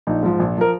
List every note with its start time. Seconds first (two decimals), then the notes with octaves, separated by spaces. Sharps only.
0.07 A#1 D#4
0.23 G#2 F3
0.39 A#1
0.58 F3 A#4